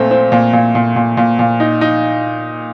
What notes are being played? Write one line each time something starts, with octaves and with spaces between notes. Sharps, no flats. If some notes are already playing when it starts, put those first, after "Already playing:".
Already playing: A#2 A3 C4
C4
A#2
A#2
A#2
A#2
A#2
A#2
D#4
D#4